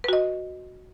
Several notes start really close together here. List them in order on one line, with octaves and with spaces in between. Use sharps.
B4 F#4 D#5